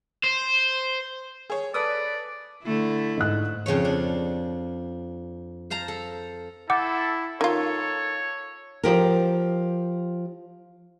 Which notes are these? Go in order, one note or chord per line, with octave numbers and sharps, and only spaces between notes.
C5
G#4 C#5
A4 B4 D5 D#6
D3 A3 E4
G#2 F#6
F2 C#3 F3 C#5
D4
C5 F5 A5 A#5
A4
E4 A4 F#5 D6 G6
D#3 F4 A4 C#5
F3 G4 A#4